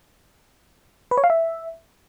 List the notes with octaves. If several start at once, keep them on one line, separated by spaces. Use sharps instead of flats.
B4
C#5
F5
E5